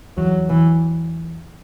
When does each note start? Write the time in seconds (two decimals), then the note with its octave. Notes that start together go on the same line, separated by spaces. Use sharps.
0.17 E2 F#3
0.49 E3